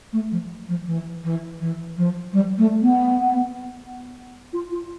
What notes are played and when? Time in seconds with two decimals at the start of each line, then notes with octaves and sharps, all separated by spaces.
0.13 A3
0.31 F3
0.68 F3
0.86 E3
1.23 E3
1.60 E3
1.97 F3
2.33 G3
2.58 A3
2.82 B3
4.53 F4
4.71 F4